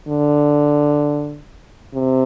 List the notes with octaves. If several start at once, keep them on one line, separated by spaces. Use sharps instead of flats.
D3
C3